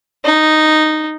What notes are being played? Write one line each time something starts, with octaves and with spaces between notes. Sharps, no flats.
D#4